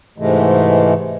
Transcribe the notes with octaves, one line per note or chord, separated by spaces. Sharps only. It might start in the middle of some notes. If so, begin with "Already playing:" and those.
G#2 C3 E3 G#3 A3